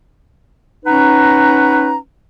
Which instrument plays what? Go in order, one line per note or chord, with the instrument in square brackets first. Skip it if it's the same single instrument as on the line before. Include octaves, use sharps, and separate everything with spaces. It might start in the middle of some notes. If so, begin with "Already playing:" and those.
[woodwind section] C#4 D#4 B4 F#5 A#5